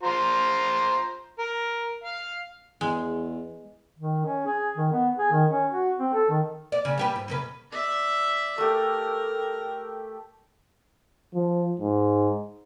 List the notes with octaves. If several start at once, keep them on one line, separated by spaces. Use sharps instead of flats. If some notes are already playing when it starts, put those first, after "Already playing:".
F4 C5 A#5
A#4
F5
E2 G#3
D#3
C#4
G#4
D#3
B3
G#4
D#3
C#4
F#4
C4
A4
D#3
D5
C#3
G3 G4 B4
G#2
F#2 C#3 B4
D5 E5
A3 G4 A#4
F3
G#2